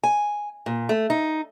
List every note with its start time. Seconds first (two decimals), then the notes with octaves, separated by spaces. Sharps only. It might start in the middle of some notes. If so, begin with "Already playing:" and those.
0.04 G#5
0.66 A#2
0.89 A3
1.10 D#4